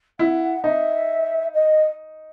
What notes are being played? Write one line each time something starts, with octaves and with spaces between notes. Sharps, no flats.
E4 F#5
D#4 E5
D#5